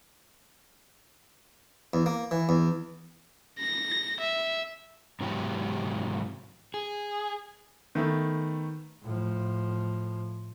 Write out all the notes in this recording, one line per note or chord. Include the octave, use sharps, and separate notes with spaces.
E2
A#3
E3
E2
A#6
E5
G#2 C3 E3 F#3 B3 G4
G#4
D#3 A3 B3
A2 F3